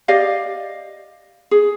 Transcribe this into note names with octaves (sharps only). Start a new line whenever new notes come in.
G4 D5 D#5 F5
G#4